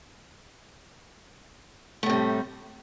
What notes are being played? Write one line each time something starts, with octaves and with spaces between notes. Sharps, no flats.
A2 C3 G3 A3